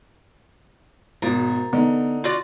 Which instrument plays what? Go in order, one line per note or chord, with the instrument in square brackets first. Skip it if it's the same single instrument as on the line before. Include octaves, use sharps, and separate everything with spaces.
[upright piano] G#1 B2 A6 [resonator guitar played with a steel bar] A#4
[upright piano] D3 D#4 [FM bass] B3
[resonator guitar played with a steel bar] F4 F#4 D5